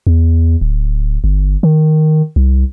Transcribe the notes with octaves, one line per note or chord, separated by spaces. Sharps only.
E2
D1
G1
D#3
C2